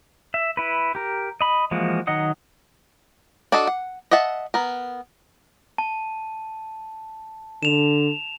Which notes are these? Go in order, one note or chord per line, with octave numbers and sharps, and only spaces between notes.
E5
E4 B4
G4 A#4
D#5 B5
E3 F3 G#3 A#3 F#4
D#3 F#3 D#5 F#5 D#6
D4 F#4 A4 D#5 A5
F#5
D#5 E5 F#5 A5
B3 A#4
A5
D3 E7 F7